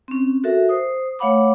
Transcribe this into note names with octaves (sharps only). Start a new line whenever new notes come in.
C4 C#4
F#4 A4 A#4 E5
C5 D#6
A3 C#5 F5 F#5 B5 D6